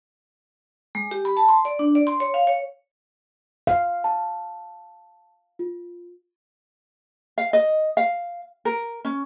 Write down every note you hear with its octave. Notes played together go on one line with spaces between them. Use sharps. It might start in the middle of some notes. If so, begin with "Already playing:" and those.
G#3
G4
B5
A5
C6
D5
D4
D5
C6
C#5
F5
C#5
F5
A5
F4
F5
D#5
F5
A#4
C#4